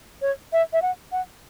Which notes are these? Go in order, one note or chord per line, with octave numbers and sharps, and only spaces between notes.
C#5
E5
E5
F#5
F#5